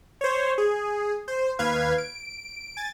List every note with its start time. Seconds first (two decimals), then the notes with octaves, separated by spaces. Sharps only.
0.21 C5 C#5
0.58 G#4
1.28 C5
1.59 D#2 B4 F5 G#6
1.98 D7
2.77 G#5 A6